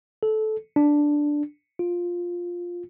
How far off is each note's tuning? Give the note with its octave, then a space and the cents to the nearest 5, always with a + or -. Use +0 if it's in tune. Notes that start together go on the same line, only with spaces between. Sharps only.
A4 -20
D4 +0
F4 +5